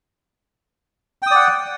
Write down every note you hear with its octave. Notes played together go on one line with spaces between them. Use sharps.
D5 F#5 G5 D#6